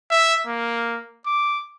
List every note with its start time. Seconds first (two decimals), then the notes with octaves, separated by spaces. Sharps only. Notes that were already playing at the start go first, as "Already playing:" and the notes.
0.10 E5
0.47 A#3
1.26 D6